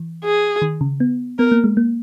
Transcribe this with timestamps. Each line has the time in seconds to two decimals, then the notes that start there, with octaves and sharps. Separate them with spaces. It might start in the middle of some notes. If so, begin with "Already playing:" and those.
Already playing: E3
0.24 G#4
0.62 D#3
0.81 C#3
1.00 B3
1.39 B3 A#4
1.52 A#3
1.64 G#3
1.77 A#3